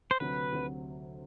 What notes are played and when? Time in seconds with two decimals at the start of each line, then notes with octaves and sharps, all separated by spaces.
0.11 C5
0.20 D2 C3 F#3 B4
0.53 D2 C3 F#3